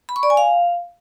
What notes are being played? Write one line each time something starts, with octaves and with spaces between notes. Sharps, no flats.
B5
C#6
D5
G#5
F5